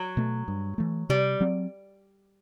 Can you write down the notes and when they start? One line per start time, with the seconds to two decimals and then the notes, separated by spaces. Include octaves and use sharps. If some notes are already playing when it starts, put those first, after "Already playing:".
Already playing: F#3
0.17 B2 A3
0.48 G2
0.78 E3 A3
1.09 C3 G3
1.41 F#3 C4